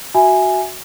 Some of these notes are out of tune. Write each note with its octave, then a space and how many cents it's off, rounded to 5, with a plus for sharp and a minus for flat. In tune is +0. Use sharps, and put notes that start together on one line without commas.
F#4 +0 E5 +0 G#5 +0